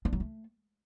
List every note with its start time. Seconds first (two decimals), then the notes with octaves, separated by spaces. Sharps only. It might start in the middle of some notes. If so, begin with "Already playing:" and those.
0.05 D4
0.13 F#3
0.20 A3